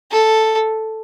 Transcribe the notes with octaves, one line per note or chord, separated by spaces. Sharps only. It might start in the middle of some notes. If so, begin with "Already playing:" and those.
A4